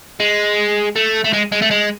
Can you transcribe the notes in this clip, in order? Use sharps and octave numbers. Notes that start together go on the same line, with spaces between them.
G#3
A3
A3
G#3
G#3
A3
G#3